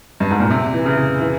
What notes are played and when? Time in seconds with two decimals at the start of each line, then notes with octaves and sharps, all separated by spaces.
0.20 G2
0.31 G#2
0.40 A#2
0.50 C3
0.74 E3
0.86 C#3
1.20 E3